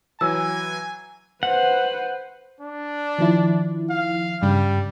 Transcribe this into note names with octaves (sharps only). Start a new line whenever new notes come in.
E3 F#3 G#5 E6
B4 C5 F#5
D4
D#3 F3 E4
F5
G2 C#3 G3